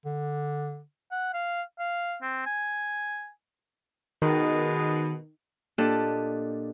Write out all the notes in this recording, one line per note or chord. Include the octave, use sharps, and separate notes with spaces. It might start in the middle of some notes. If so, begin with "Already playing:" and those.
D3
F#5
F5
F5
C4
G#5
B2 D#3 G#3 B3
A#2 D4 G4 A4 D#5 F#6